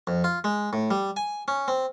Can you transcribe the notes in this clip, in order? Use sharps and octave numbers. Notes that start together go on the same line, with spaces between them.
F2
F4
G#3
A2
G3
G#5
C#4
C4